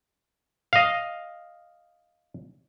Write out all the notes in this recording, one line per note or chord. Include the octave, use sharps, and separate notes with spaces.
D#5 F5